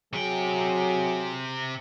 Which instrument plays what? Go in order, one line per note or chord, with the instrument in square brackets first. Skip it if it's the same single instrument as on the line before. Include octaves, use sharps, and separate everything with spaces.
[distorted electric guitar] C3 G5 [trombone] F#3 [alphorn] G#4